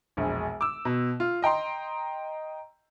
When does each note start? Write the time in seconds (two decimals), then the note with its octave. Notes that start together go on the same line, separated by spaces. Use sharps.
0.17 E1 A#1
0.61 D6 E6
0.85 B2
1.20 F4
1.42 D#5 G5 A#5 C6